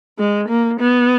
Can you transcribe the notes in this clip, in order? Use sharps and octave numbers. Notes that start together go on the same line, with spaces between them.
G#3
A#3
B3